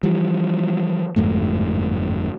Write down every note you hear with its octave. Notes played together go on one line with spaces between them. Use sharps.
E3 F3 G3
G1 F2 G#2 A3